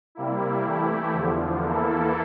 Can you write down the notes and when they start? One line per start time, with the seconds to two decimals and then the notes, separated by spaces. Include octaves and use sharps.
0.15 C3 G3 A#3 E4
0.64 E3 A3 E4 G4
1.13 E2 D3 F3
1.63 E2 E3 A#3 E4 A4